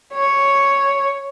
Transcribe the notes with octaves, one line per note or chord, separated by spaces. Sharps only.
C#5